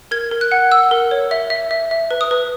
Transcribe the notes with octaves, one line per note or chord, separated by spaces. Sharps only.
A#4 G#6
A#4
F#6
F#5
F#5 E6
A#4
C#5
E5
E5
E5
E5
B4
D#6
B4